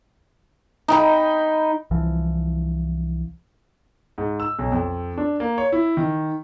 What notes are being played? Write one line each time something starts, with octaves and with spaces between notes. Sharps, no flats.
D#4 G5 B5
C2 E3 F3
G#2
E6
B1
F2
D4
A#3
C#5
E4
D#3